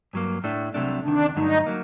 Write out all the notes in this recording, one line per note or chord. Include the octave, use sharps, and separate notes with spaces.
G2 F#3 A#3
A2 A3 D4
C2 C3 F#3 A3 D4
D2 C3 D#3 D4
G2 D3 F#3 A3 D#4
F#3 A#3